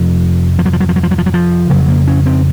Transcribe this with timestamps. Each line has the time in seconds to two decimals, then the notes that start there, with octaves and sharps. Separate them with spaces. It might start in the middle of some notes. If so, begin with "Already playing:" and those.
Already playing: F2 C3 F3
0.59 F3
0.66 F#3
0.73 F3
0.81 F#3
0.89 F3
0.96 F#3
1.03 F3
1.11 F#3
1.18 F3
1.26 F#3
1.34 F3
1.70 F2 C#3 F#3
1.88 A#3
2.07 C#4
2.26 C4